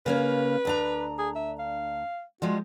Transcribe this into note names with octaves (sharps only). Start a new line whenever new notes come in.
C#3 A#3 C#4 B4
D2 D4 A#5
G#4
E5
F5
F3 G3 G#3 F#4